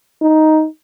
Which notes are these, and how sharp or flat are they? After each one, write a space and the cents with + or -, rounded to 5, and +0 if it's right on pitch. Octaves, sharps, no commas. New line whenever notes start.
D#4 +5